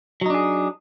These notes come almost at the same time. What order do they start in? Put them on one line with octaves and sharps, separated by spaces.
F#3 D#4 D4 G#4